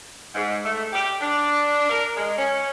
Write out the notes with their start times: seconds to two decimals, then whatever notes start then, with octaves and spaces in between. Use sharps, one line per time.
0.35 G#2
0.65 A3
0.93 G4
1.21 D4
1.89 A#4
2.17 G#3
2.38 C#4